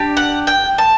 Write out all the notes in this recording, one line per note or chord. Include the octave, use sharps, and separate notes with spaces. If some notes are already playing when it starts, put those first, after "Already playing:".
Already playing: D4 G4
F#5
G5
A5